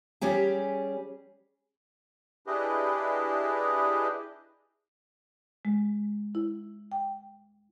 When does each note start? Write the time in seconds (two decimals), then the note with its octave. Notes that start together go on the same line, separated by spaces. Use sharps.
0.21 G3 C#4 G4 G#4
2.47 D4 E4 G4 G#4 B4 D#5
5.65 G#3
6.35 E4
6.92 G5